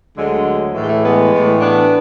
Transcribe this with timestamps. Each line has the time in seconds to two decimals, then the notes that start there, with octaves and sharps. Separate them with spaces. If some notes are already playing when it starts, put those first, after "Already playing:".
0.17 D2 D3 F#3 G#3
0.74 A2 E3
0.81 G#3
0.88 A3
1.03 G#3 B3
1.31 A2 E3
1.60 B3 D4